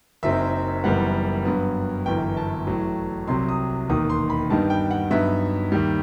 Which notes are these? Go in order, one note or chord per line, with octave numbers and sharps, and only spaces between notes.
F#1 F#2 F#3 C4 D#4 E5
F#1 F#2 E3 G3 B3 F#5
G2 F#3 B3
G1 F#2 E3 G5
A5
A1 A2 F#3
C2 C3 F#3 C6
D#6
E1 D#2 D#3 D#6
C6
B5
G2 D#3 G3 B3 D#4 A5
G5
F#5
G2 F#3 B3 D#4 E5
D#2 D#3 G3